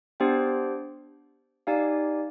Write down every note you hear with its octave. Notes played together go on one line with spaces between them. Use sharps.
B3 D4 G4 C5 G5
D#4 G4 D5 F5 G#5